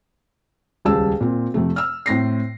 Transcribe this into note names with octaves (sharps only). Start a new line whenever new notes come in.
D#1 C#2 G3 G#4 A5 E6
A#2 C4
F2 C3 A3
E6 F6
A2 C4 A#6 C7